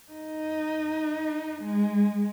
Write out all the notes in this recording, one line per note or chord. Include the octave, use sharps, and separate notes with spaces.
D#4
G#3